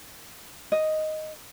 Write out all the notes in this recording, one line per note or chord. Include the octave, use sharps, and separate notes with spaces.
D#5